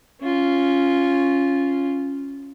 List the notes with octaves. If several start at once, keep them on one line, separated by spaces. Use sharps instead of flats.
C#4 F4